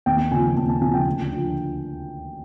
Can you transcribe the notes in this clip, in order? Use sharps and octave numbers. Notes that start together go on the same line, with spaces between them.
D#2 G5
C#3 F3 G#5
D#2 A5
A5
C#3 F3 G#5
G5
D2
D3 F3